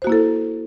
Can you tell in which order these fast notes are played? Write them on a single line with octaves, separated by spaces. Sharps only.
C5 F#4 A#3 E4 A4